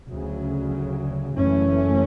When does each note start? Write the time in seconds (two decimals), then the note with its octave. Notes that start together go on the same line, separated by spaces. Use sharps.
0.10 D2 C#3 F#3
1.35 F#1 F#2 E3 A3 C#4